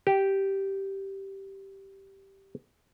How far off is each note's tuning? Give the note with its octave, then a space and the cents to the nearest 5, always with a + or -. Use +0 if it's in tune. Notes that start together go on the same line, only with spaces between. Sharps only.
G4 -10